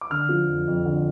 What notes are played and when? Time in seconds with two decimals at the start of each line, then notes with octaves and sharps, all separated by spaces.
0.01 D6
0.10 D3 F6
0.29 F3
0.48 F2
0.68 F2
0.85 D3